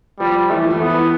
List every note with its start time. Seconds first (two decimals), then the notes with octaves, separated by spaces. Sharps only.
0.20 F3 G3
0.50 E3 A3
0.64 F3
0.70 E3
0.81 B3
0.90 E3